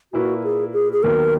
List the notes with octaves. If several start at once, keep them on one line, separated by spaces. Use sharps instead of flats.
A#2 A#3 E4 F#4 B4
G#4
G#4
G#4
D#2 D#3 F#3 B3 A#4